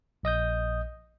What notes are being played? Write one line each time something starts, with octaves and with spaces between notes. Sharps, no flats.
A#1 D#5 D#6 G6